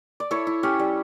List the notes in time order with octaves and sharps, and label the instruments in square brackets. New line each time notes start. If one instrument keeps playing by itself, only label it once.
[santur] D5
E4 A4 C#5
E4
C#4 G4
G3